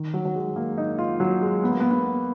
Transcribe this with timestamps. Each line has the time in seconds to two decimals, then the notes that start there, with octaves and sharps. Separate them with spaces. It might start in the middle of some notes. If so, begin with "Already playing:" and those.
Already playing: D#3
0.14 F#3
0.25 F#3
0.34 G#3
0.56 A#3
0.78 D#4
0.99 F4
1.20 F#3
1.41 G#3
1.64 B3
1.72 A#3
1.80 B3
1.91 B3